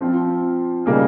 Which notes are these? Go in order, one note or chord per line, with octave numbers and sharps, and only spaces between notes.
F3 C4 F4
C#3 G3 A#3 D#4 G#4